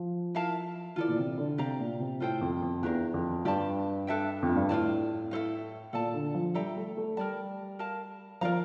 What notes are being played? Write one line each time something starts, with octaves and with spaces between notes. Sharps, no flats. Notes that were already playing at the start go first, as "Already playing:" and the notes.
Already playing: F3
E4 A#4 F5 A5
E3 F4 A4 D5
A#2
C3
D3
C3 G4 D5 F5 A#5
A#2
C3
A2 F4 A4 C5 G5
F2
F2
E2 D4 G4 A#4 F5
F2
G2 G4 D5 A5
D4 A4 E5 G5
F2
G2
A2 F4 A#4 D5 A5
E4 A4 C5 F5
A#2 A4 D5 A5
D3
F3
G3 A4 E5 G5 A#5
G3
A3
A3
G3 A#4 D5 A5
A#4 F5 A5
F3 A#4 D5 F5 A#5